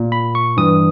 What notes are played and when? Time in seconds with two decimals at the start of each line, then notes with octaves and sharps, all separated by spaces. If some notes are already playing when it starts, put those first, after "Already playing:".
Already playing: A#2
0.12 B5
0.35 C#6
0.57 G2 E3 D#6